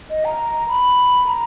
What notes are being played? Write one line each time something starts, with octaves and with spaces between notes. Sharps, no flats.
D#5
A#5
B5
A#5